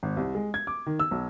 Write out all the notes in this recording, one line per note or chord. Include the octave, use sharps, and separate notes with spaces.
G#1
C2
G#3
G#6
D6
D#3
E6
B1